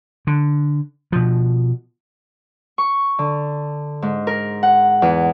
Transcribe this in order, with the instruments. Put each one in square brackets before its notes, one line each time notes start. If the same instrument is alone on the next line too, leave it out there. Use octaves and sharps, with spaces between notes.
[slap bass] D3
B2 F3
[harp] C#6
D3
G#2
A#4
F#5
E2